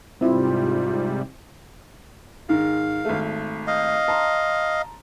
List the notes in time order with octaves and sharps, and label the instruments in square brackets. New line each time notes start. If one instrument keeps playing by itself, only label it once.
[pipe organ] G#2 C3 G3 [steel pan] C4 E4 [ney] F4
[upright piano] G#2 D#3 G#3 [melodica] F5
[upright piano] G#1 A3
[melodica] D#5 F5
[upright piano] A5 A#5 C6